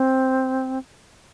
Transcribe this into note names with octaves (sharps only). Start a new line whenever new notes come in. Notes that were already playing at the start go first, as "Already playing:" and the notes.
Already playing: C4